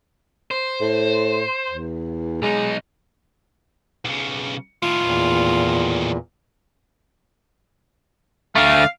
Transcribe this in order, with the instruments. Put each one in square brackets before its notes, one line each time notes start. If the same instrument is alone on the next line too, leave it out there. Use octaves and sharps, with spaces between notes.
[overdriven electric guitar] C5
[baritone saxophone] A2
E2
[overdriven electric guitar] B1 D#4 [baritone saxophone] G#3
[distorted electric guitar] B1 C#3
[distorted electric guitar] A2 D#3 [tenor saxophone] F4
[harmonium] E2 A#2
[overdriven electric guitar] D3 A3 [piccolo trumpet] F5